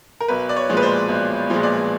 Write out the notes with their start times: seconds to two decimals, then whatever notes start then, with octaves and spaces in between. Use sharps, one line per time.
0.20 A#4
0.28 B1 B4
0.49 D5
0.56 C#5
0.69 A#2 F3 G#3
0.77 B4
0.82 C5
1.09 B1
1.50 A#2 F3 G#3
1.63 D5